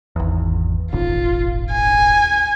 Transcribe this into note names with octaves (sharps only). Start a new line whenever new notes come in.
G#1 E2
D#1 G#1 F4
G#5